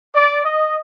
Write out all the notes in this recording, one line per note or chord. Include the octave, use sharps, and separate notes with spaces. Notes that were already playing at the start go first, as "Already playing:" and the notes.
D5
D#5